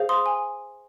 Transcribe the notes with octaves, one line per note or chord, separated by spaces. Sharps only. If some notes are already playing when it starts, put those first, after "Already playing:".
Already playing: G#4 C5 F5
C6 D#6
G#5